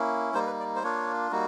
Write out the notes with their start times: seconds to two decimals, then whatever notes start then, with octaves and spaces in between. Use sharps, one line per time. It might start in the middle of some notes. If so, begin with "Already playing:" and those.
Already playing: A#3 C#4 E4
0.34 G3 A#3 D#4 C5
0.47 B4
0.60 D5
0.76 C5
0.83 A#3 D4 F4 C#5
1.32 G3 A#3 D#4 F#4